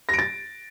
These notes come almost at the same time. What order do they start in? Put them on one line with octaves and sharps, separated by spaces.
A#6 D7 A6